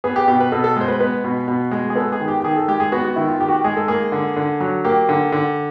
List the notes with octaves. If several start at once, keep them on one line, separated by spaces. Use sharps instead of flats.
B3 G#4
G4
B2 G4
B4
B2 A4
A4
G#3 C5
B4
B3 B4
B2
B2
G#3
G#4
B3 A4
G#4
D#3
G4
G4
D#3 G#4
A4
G#3 G4
G#4
B3 F#4
F#4
D#3 E4
F4
D#3 G4
F#4
G4
G#3 G#4
A4
A#3 G#4
D3
D3
F#3
A#3 G4
D3
D3